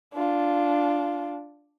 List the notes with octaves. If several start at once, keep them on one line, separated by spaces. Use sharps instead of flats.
D4 F4